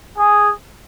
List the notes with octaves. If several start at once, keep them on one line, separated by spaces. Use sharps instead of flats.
G#4